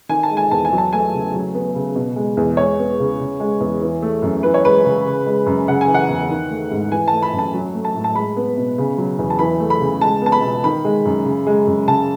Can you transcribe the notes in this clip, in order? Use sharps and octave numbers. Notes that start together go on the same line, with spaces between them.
D#3 G#5
A5
G#3
G#5
E2 A5
G#5
F#3
A5
A3 G#5
C#3
F#3
B3
C#3
B2
G#3
E2
G#3 C#5
B3
C#3
C#3
G#3
E2
E3
A3
F#2
E3 B4
C#5
G#3 B4
C#3
C#3
G#3
F#2
C#3 F#5
G#5
E3
F#5
E2
D#3
A3
G#2
E3 G#5
A5
A3
B5
F#2
A5
F#3
A3
A5
A2
A5
G#3 B5
B3
B2
C#3
F#3
E2
A5
E3 B5
A3
B5
C#3
G#3 A5
B3 A5
B5
B2
D#3 B5
G#3
F#2
C#3
G#3
F#2
C#3 A5